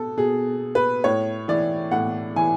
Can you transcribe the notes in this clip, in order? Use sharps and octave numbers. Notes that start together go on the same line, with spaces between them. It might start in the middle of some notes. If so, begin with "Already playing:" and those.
Already playing: B2 A4
B2 G#4
B4
A2 C#5
E3 D5
A2 F#5
E3 G#5